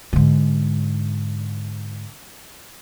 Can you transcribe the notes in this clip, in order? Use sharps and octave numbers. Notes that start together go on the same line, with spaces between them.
G#2 D3